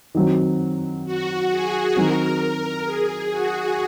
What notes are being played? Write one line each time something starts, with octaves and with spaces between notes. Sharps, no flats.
D#3 F#3 C4
F#4
G#4
D#3 F#3 C4 A#4
G#4
F#4